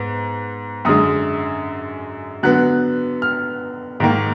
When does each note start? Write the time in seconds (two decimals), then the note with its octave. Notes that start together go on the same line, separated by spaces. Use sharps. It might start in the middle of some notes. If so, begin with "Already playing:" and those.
Already playing: G#2 B3
0.85 F#2 D3 G#3 D#6
2.43 D3 F#3 B3 F#6
3.22 F6
4.00 G#2 D#3 A#3